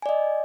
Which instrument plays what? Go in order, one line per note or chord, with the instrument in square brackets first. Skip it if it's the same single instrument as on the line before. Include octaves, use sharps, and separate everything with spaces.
[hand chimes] G#5
D5
D#5